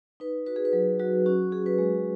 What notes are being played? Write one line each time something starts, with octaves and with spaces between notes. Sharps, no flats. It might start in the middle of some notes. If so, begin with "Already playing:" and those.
D#4 B4
F#4 B4
G#4
B4
F#3
F#3 F#4
C#4 F#4
F#4 G#4
B4
G#3